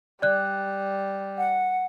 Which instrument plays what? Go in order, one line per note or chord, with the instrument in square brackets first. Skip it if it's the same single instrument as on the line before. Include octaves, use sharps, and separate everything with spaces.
[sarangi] G3 [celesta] D5 F#6
[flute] F#5